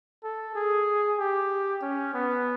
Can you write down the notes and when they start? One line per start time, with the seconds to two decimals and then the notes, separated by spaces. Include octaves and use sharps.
0.24 A4
0.55 G#4
1.19 G4
1.82 C#4
2.14 B3